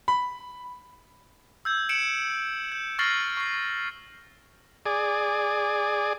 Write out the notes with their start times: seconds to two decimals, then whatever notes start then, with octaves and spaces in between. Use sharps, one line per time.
0.08 B5
1.65 E6 G6 G#6
1.89 C#7 D7 E7 F#7
2.72 G6
2.99 C#6 F6 A6 A#6 C7 F#7
3.37 C#6 C7
4.86 G#4 D5